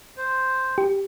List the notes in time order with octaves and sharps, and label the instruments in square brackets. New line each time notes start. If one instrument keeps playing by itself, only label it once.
[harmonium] C5
[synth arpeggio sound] G4